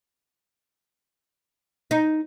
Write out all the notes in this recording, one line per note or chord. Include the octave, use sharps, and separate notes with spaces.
D#4